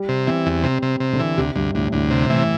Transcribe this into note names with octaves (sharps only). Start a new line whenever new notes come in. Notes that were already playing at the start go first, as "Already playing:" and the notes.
Already playing: G3
C3
E3 C4
E2
C3 C4
C3
C3
D3
E3
D2 C3
D2 G2
D2 A2
D2 A2
C3
A2 E3